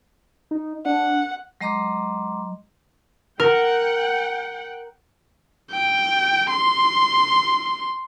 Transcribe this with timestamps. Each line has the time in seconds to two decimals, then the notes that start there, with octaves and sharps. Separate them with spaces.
0.51 D#4
0.85 D4 F#5
1.61 F#3 G#3 D#5 A#5 C6 D6
3.40 A#4 F#5 G5
5.71 G5
6.50 C6